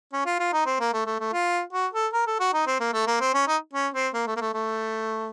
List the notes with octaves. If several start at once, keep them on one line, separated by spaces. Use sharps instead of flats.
C#4
F4
F4
D#4
C4
A#3
A3
A3
A3
F4
F#4
A4
A#4
A4
F#4
D#4
C4
A#3
A3
A#3
C4
C#4
D#4
C#4
C4
A#3
A3
A#3
A3
A3